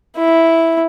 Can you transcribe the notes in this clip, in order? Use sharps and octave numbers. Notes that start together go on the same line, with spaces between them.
E4